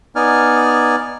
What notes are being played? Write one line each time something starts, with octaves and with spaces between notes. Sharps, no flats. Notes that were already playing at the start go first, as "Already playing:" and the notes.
B3 D#4 D5 G#5 F6